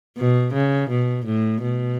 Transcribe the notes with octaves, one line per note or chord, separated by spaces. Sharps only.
B2
C#3
B2
A2
B2